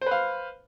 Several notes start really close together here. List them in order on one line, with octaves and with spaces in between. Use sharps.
C5 B4 F5